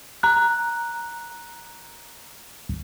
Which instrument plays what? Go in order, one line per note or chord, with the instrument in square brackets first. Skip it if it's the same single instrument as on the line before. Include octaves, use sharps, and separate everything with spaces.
[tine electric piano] A#5 F#6